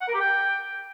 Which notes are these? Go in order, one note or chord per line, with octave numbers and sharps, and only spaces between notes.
F#5
A#4
G4
G5